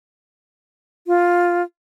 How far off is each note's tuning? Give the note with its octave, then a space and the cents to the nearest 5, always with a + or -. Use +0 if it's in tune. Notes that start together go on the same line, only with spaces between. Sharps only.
F4 +5